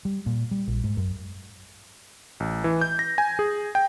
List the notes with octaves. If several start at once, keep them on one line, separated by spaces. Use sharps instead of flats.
G3
A#2
G3
A#1
G#2
F#2
A1
E3
G6
A#6
G#5
G#4
G5